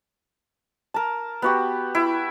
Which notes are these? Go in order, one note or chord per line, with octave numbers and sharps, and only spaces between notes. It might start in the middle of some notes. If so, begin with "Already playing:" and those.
A#4 A5
B3 F#4 G4
E4